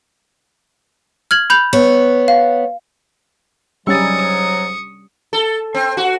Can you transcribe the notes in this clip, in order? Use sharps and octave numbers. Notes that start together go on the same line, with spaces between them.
F6 G#6 F#7
B5 G6 F7
B3 C#5
F5
G#2 F#3 G3 C#4 C#6 D#6 E6 A6
A4
C4
F#4